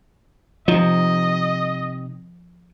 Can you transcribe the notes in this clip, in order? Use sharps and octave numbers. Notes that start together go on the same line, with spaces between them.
C3 F3 D#4 D#5